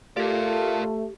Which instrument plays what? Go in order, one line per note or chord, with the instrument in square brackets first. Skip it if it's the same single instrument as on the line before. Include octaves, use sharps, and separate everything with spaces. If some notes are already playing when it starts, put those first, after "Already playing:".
[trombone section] A3 [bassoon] F4 [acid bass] G4 [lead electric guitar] A#4 D5